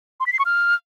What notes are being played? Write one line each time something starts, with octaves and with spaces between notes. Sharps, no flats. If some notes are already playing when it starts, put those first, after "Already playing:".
C6
B6
C7
C#6
F6